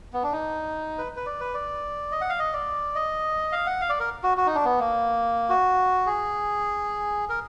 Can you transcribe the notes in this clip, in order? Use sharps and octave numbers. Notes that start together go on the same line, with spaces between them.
B3
D4
D#4
B4
B4
D5
B4
D5
D#5
F#5
F5
D#5
D5
D#5
F5
F#5
F5
D5
A#4
F#4
F#4
D#4
D4
B3
A#3
F#4
G#4
A#4